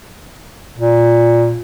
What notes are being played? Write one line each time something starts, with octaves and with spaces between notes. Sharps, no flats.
A#2